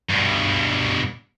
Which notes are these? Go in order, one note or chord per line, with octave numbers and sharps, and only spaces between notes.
G2 B2